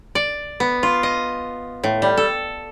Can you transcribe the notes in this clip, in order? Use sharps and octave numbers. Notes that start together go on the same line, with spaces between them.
D5
B3
F4
D#5
A2
G3
A4